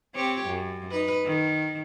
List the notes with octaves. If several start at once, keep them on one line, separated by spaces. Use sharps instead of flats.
C4 G4 C#5
F#2
D#4 B4
D#3